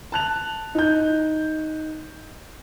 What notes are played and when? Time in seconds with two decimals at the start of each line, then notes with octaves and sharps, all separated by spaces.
0.12 A5 F#6 F7
0.75 D#4 G6